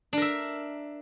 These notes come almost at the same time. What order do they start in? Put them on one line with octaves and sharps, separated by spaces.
D4 A#4 E5